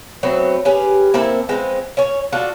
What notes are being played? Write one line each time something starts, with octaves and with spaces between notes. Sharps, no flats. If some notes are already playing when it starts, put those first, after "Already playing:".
F#3 A3 B3 C4
C#4 G4 G#4 B4
A#3 C4 E4 A4
F3 G#3 B3 C4
C#4 C#5
D4 F4 F#4 A4